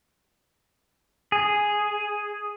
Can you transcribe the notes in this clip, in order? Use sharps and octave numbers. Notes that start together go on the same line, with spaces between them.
G#4